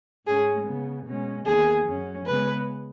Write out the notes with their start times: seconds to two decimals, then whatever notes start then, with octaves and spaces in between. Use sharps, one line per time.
0.27 G#2 G#3 C#4 G#4
0.67 C#3 B3
1.06 B2 G#3 C#4
1.46 D#2 D#3 B3 G#4
1.86 F#2 F#3 C#4
2.26 C#3 G#3 B3 B4